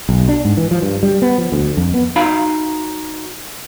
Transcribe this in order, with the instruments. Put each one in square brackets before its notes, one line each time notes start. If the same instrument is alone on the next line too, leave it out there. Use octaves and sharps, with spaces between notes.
[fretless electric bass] B1
D4
G#2
E3
F3
G2
G3
B3
F3
D2
F2
B3
[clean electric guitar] D#4 F#4 F5 B5